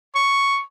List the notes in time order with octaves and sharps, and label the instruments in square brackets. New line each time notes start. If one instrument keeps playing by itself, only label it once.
[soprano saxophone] C#6